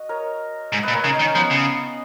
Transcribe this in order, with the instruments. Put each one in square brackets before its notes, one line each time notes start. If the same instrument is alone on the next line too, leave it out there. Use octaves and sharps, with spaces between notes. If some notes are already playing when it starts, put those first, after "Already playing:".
Already playing: [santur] F#4 D#5
A#4 C#5
[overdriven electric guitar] G#2
[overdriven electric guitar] A#2 [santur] B4 D#5
[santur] A#4 C#5
[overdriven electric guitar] C#3 [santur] D#4
[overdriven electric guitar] D#3 [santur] D#4
[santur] C#4
[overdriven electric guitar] F3 [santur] B3
[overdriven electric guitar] C#3